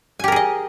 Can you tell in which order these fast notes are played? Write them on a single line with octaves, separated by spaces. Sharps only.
G#5 G4 A#4 G#4 D#5